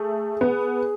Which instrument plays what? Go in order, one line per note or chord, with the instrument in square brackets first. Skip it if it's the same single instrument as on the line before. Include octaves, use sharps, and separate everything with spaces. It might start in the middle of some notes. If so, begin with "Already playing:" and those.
Already playing: [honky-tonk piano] A3 [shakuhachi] G#4
[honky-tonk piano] B3